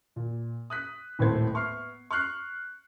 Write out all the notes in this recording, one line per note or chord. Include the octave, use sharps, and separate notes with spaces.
A#2
D#6 F#6 B6
D#1 A2 A3 C4 C5 G#6
B3 E5 C#6 F6 C7
C#6 F6 F#6 C7